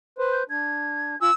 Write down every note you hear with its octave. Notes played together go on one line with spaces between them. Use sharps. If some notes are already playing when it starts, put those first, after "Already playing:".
B4 C5
G6
D4 G#6
F4 G#5 E6